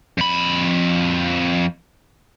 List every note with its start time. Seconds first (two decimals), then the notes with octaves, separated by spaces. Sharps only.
0.18 F2 B5